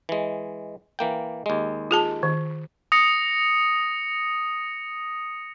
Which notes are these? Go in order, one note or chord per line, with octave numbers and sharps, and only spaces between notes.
E3 G#3
E3 A#3 G5
D#2 G#3
F4 G#4 A5
D#3
D#6 A#6 C#7